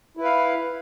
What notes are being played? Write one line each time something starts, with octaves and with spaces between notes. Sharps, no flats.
E4 B4 F5